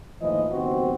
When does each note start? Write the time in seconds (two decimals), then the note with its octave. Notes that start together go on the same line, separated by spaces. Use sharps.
0.21 D#2 A2 E3 F3 D#5
0.51 F#1 D#2 B3 C4 F#4 C5